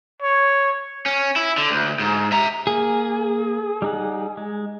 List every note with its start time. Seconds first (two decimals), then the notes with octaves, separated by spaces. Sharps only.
0.22 C#5
1.06 C#4
1.36 E4
1.57 D3
1.71 D2
2.00 G#2
2.32 E5 A#5
2.67 A#3 G#4
3.82 G3 D#4 F#5
4.37 G#3